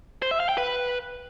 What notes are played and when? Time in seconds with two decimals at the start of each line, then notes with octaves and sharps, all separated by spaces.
0.22 C5
0.31 E5
0.40 F5
0.49 G5
0.58 B4